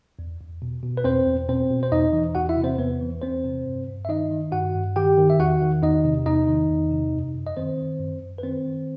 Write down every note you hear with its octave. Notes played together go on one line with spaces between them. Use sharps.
E2
E2
B2
B2
B4
E2 C4 C5
E2
B2 C4 C5
B2
C5
E2 D#4 D#5
E3
E2 F#4 F#5
E4 E5
C3
C4 C5
E2 B3 B4
E3
E2 C4 C5
C3
G2
G2
E5
D#3 D#4 D#5
D#3
G2 F#4 F#5
G2
D#3 G4 G5
D#3
E5
E2 F#4 F#5
D#3
E2 D#4 D#5
C3
E2 D#4 D#5
D#3
E2
C3
F#2
F#2
D#5
D#3 C4 C5
D#3
F#2
F#2
B4
D#3 C4 C5
D#3